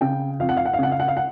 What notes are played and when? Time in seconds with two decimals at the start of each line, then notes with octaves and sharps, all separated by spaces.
0.01 C#3 G5
0.40 F2 F5
0.49 F#5
0.57 F5
0.65 F#5
0.73 F5
0.79 C#3 F#5
0.92 F5
1.00 F#5
1.08 F5
1.17 F#5